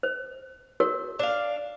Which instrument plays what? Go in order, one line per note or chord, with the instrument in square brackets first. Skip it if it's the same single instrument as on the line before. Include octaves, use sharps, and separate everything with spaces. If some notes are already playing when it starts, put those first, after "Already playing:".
[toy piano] C5
F#4 A#4 C#5
[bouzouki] D4 F5